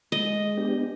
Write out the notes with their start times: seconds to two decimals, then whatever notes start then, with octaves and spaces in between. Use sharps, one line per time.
0.12 G#3 D#5
0.57 B3 D4 G4